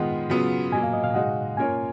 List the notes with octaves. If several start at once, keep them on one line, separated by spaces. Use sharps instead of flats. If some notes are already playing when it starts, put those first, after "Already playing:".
Already playing: D#3 G#3 B3 F4 F#5
C#3 F#3 B3 F4
B2 F#3 A#3 G#5
F5
D#5
F5
G#3 D#4 F#4 F#5
A#3 C#4 F4 A#4 C#5 G#5